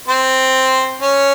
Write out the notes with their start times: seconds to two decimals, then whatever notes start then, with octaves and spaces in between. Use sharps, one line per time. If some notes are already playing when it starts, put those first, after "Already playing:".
0.08 C4 C5
1.01 C#4 C#5